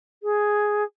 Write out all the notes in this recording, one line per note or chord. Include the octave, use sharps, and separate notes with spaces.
G#4